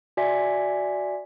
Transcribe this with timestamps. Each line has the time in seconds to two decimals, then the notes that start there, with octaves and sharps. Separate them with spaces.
0.17 F#4 D5 E5 G#5 B6